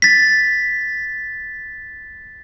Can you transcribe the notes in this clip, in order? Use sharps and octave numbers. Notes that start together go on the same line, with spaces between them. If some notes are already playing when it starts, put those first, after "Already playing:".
A6 B6